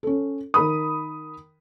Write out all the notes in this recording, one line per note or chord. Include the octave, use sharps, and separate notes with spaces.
C#4 A4
D#3 A#4 B5 D#6